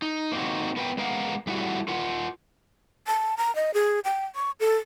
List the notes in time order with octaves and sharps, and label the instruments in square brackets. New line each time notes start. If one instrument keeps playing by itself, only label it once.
[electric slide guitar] D#4
A#3 C4 D#4 F#4
B3 A#4 B4 F5 G5
G#3 B3 A#4 F5 F#5
G3 A3 E4 F#4 F#5
F4 A#4 F#5
[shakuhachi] A5
A#5
D#5
G#4
G5
C#6
A4